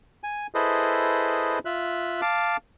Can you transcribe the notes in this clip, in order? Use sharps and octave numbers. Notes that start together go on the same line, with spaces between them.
G#5
E4 G#4 A4 B4 C5 D#5
F4 E5 F#6
F5 A5 D6